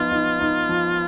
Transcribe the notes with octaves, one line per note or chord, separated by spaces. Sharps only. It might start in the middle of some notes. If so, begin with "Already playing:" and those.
Already playing: F3 B3 D#4 F4
D#4
D#4
F3